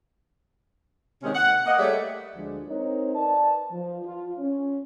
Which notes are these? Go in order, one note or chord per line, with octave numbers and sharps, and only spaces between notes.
C3 D#3 G#3 A#3 C#4
F#5
A#3 D#5 F#5
G3 A3 G4 G#4 C#5 E5
D2 F3 G#3 D4
C4 D#4 A#4 C5 C#5
B4 D5 A5
F3
F4
C#4